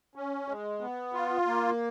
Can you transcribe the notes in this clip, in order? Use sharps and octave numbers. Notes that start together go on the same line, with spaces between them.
C#4
G#3
B3
F4
A#3